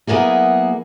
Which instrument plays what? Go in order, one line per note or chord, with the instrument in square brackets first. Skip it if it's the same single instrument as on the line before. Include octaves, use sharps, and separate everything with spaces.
[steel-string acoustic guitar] F#3 A#3 B3 E4 G#4